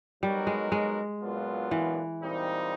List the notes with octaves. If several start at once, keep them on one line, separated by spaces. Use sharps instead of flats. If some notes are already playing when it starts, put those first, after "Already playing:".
F#3 G3 B3 D#4 F#4 A#4
G#3
G#3
A#2 F#3 B3 D4 F4
E3
A#2 G3 C4 D#4